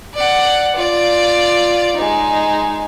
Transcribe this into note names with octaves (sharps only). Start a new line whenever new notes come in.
D5 F#5
F4 D5
G#3 D#4